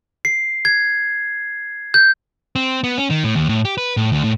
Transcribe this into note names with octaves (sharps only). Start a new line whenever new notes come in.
C7
G#6
G6
C4
B3
C#4
D#3
A2
D#2
A2
G4
B4
A2
D2
A2